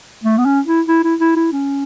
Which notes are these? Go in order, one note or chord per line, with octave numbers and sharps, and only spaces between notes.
A3
B3
C#4
E4
E4
E4
E4
E4
C#4